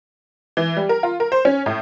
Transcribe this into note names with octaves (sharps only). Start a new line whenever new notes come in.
E3
G3
A#4
F4
A#4
C5
C#4
A2